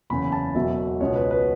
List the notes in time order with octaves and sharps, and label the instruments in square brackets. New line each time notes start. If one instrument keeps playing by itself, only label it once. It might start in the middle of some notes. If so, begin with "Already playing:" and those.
[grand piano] F#1 E2 C#3 B5
A5
E1 E2 B2 F#3 E5
C#2 B2 B3 C#5
B4
B4